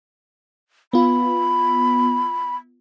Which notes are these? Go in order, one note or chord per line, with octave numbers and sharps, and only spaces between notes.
B3 F4 B5